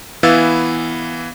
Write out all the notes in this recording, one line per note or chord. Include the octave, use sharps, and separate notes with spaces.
E3 B3 E4 F5 E6 A6